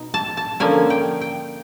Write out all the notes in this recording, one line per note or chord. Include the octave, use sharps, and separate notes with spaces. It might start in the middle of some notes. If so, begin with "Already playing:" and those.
Already playing: B2 D#4
A5
A5
D3 F3 A#3 C#4 G#5
G5
G5